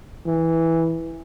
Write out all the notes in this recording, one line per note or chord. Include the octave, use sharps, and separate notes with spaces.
E3